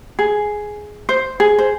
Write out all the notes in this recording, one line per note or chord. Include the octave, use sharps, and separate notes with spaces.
G#4
C5
G#4
C5